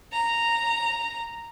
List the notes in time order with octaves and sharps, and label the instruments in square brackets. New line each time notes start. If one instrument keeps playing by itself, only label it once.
[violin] A#5